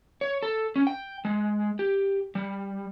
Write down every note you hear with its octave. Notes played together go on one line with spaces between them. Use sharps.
C#5
A4
C#4
G5
G#3
G4
G3